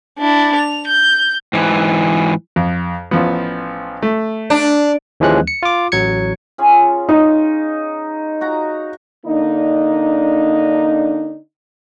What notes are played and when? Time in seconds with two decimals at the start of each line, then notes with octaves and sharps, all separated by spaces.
0.19 D4 E4
0.55 F7
0.88 G6
1.53 G#2 E3
2.56 F2
3.11 A1 F3 B3
4.02 A3
4.50 D4
5.20 D#2 E3 F3 G#3 C#4 F#6
5.47 C#7
5.63 F4 D6
5.92 A1 F#3 G#6 C#7
6.58 C#4 F4 G#4
7.09 D#4
8.41 F#4 F5 A#5
9.26 D3 A#3 D4 D#4